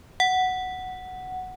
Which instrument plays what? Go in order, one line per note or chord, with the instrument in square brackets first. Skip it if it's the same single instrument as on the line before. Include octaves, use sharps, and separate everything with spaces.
[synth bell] F#5